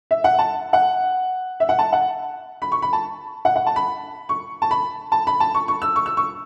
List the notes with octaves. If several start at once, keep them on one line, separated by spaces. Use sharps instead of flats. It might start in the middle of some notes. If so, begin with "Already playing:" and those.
E5
F#5
A5
F#5
E5
F#5
A5
F#5
B5
C#6
B5
A5
F#5
F#5
A5
B5
C#6
A5
B5
A5
B5
A5
C#6
C#6
E6
C#6
E6
C#6